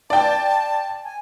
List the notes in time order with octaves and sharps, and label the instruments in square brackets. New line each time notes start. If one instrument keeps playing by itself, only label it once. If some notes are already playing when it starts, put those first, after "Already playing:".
[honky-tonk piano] D5 G5 [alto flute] A5
[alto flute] G#5